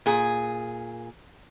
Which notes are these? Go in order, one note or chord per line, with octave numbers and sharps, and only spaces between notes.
A#2 G#4